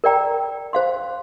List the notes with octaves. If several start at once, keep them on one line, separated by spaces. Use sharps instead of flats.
A#4 D5 G5 A#5
C5 F5 C6